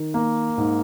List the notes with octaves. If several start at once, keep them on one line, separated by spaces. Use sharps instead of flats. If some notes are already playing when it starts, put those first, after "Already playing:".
Already playing: D#3
A#3
G#2